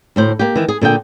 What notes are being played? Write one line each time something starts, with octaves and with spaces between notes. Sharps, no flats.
D2 A2 C5
A#3 G4
D#3 E3
G#4
A#2 D3 G#4 G5